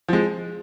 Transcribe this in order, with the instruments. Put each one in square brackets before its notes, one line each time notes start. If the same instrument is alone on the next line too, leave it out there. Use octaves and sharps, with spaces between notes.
[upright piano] F3 G#3